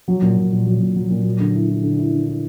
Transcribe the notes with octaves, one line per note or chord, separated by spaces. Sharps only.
F#3
A#2
A#2
A#2
F#3
A#2
F#3
A#2
F#3
D3
E4
E4
D3
E4
D3
E4